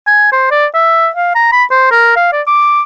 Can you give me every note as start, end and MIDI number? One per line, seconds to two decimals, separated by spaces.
0.07 0.28 80
0.32 0.51 72
0.51 0.66 74
0.74 1.08 76
1.15 1.32 77
1.35 1.50 82
1.52 1.64 83
1.71 1.90 72
1.91 2.16 70
2.16 2.31 77
2.33 2.42 74
2.47 2.81 86